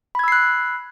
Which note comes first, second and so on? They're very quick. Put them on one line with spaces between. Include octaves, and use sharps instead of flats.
B5 G#6 E6 C7 F#6